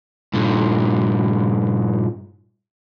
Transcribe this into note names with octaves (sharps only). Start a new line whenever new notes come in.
G2 A#2